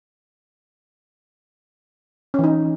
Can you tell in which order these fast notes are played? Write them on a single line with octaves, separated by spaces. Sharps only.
C#4 E3 D#4